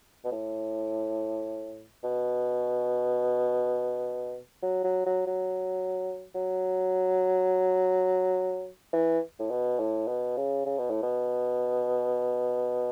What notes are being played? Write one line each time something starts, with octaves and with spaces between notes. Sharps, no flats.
B2
A2
B2
F#3
F#3
F#3
F#3
F#3
E3
A2
B2
A2
B2
C#3
C#3
B2
A2
B2